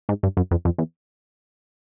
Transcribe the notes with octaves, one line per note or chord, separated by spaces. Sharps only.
G#2
G2
F#2
F2
F2
E2